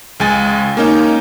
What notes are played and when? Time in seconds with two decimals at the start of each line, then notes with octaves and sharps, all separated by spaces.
0.20 C#2 G#3 G#5 A6
0.77 A#3 C#4 D#4